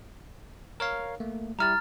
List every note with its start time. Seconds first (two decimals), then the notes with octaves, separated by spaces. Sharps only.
0.80 A#4 C#5 F5
1.20 A3 A#3
1.59 G3 E4 G4 A#5 F6 A6